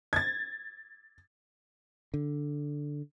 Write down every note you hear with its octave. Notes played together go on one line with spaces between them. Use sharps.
G#6 A6
D3